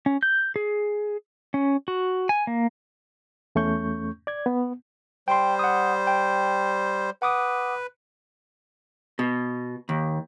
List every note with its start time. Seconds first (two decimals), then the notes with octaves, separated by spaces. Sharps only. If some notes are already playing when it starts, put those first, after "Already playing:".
0.06 C#4
0.23 G6
0.56 G#4
1.54 C#4
1.88 F#4
2.29 G#5
2.47 A#3
3.55 E2 A3 C#4 C#6 G6
4.27 D5 G#6
4.46 B3
5.28 G3 C5 G5 C6
5.59 F#5 D#6
6.07 G5
7.22 B4 F#5 D6 D#6
9.19 B2
9.89 D#2